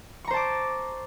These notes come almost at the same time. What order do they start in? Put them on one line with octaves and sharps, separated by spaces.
C#6 A#5 C5 A5 D6